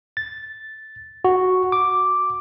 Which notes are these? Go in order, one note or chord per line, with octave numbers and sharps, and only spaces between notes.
A6
F#4
D6